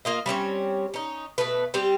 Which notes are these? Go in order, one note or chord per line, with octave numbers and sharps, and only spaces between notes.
A#3 F4 D#5
G3 C4 C#4 C#5
C#4 D#4
B2 A3 B4
G3 C4 G4